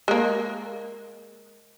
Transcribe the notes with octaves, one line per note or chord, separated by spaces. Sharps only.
G#3 A#3